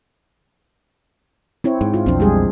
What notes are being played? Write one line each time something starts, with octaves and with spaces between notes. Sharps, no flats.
C4 E4 C#5
G#2
F4
B1 F2 C4 D4
G3 G#3 G#4